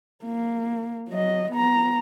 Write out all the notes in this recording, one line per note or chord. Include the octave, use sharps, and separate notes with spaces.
A#3
F#3 D#5
B3 A#5